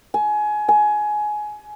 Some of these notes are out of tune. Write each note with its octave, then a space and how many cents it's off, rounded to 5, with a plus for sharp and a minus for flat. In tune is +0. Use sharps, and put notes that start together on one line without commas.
G#5 +25
G#5 +20